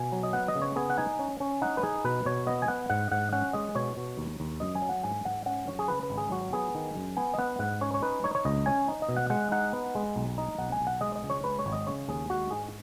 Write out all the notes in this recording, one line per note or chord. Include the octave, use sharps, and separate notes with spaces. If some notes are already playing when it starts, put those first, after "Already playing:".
Already playing: B2 G#5
F#3
D#5
B3 F#5
D#5
C#3
C#5
B3 G#4
F#5
D#4 G#5
C#4
C#4
D#4 F#5
B4
D#4 G#4
B2 B4
B2 C#5
B3 D#5
G#5
B3 F#5
G#2 F#5
G#2 F#5
C#4 F#5
G#3 D#5
B2 C#5
B2
D#2
D#2
F#2 D#5
G#5
F#3
F#5
G#2 G#5
G#2 F#5
C#4 F#5
F#2 C#5
G#4
C#3 B4
B4
G#1
G#4
F#3 F#4
B3 G#4
D#3
F#2
B3 G#5
D#5
B3 F#5
G#2 F#5
C#4 C#5
C#5
D#4 B4
D#4 C#5
C#5
C#2 D#5
C#4 G#5
D#4
D#5
B2
F#5
G#3 F#5
D#4 F#5
B3
G#3
B1
D#4
B1 F#5
G#5
B1
F#5
G#3 D#5
D#5
C#2
C#5
G#3 B4
C#5
G#1
D#5
C#3 C#5
D#2 G#4
G#3 F#4
G#2 G#4